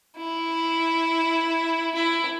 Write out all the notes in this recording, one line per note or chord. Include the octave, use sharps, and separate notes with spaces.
E4
E4